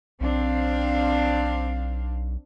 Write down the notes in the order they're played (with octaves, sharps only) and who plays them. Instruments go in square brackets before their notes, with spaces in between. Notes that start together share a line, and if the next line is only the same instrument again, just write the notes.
[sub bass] B1 [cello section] C4 D4 F5